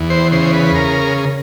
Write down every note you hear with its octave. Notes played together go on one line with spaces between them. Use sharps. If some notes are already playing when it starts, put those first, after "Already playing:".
Already playing: E2
C5
C#3 C5
B4
A#4